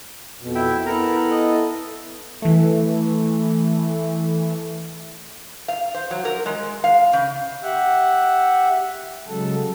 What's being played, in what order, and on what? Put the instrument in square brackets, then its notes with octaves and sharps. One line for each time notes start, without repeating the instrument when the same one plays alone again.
[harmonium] F2 B2
[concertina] E4 E5 G5
[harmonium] B3 E4 A4 [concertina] A#4 A#5
[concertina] D#5
[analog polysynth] E3 A3
[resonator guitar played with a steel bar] F5
C5
F#3
A#4
G#3
F5
C#3
[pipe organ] G4 E5 F#5
C#3 F#3 G#3 A4